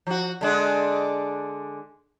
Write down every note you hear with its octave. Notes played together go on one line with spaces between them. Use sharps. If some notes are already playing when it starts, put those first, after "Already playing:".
F3 F#4
D3 G#3 D4